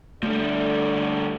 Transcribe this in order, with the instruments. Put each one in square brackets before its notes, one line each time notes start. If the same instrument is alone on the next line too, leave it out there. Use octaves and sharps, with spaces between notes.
[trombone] D3 [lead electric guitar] F3 G3 [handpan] A3 [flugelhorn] D5